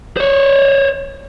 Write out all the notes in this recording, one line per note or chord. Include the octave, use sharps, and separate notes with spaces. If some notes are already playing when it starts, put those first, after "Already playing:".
C5 C#5